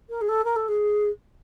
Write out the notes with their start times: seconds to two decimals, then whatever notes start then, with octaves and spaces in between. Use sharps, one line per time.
0.10 A#4
0.21 G#4
0.29 A4
0.44 A#4
0.56 A4
0.68 G#4